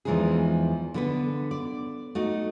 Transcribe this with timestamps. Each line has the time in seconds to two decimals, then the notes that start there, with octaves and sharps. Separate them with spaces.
0.05 E2 E3 F3 G#3 D#4 G#4
0.94 D3 B3 B4
1.51 D5
2.15 A3 D#4 F#4